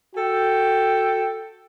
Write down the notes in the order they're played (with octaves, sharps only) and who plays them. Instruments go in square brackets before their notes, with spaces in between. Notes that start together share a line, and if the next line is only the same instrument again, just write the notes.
[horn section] F#4 A4 G5